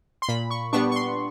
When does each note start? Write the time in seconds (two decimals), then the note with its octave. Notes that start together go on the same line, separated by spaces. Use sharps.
0.22 C6
0.28 A#2 B5
0.51 C#6
0.73 G3 B3 D4 C#6
0.92 C#6
0.96 C6